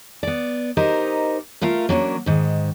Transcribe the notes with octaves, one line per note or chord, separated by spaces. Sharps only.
B3 D5
D#4 G4 A#4 C5 D#5
A3 F4 A#4 F5
F#3 A#3 C#4 D4
G#2 D#3